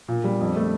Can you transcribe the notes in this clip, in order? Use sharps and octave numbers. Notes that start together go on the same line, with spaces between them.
A#2
G3
F2
A3